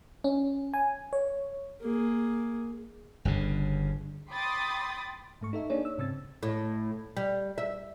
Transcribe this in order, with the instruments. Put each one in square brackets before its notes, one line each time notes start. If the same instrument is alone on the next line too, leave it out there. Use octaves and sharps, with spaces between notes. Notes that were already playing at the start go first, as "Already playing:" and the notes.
[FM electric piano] C#4
G#5
C#5
[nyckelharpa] A#3 G#4
[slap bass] G1 G2 C#3
[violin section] G5 B5 C6 D6 D#6 A6
[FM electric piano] G#2 A3 C#6
D#4 A4 E5
A#3 D4 D#4 G#4 C#5 D5
E6
G#2 C#3 C4 E6 A6
[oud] A2
G3
E5